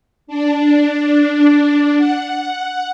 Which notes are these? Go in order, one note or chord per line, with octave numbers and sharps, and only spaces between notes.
D4
F#5